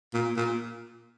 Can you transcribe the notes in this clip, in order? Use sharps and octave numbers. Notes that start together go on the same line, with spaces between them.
A#2
A#2